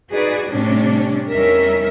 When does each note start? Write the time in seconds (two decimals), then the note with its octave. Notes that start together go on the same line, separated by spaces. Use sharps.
0.12 D#4 F#4 G#4 B4 D5
0.51 A2 C3 G3 C#4 D4
1.31 E2 G3 C#4 D#4 A#4 E5